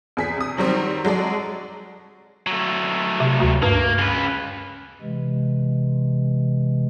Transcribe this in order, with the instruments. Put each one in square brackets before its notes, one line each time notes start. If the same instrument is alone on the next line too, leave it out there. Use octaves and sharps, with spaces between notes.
[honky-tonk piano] E2 G#4 B6
C3 D#6
D#3 F#3 G3 C4
F#3 G#3 A4 D5
[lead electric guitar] F#3 A3
[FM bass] C3
D2
[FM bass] G2 [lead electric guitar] A#3
[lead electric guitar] C#3 B4
[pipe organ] C3 E3 G#3